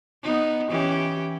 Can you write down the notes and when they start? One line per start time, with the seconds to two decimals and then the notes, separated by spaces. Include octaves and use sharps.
0.23 B3 D#4
0.69 E3 C#4 G4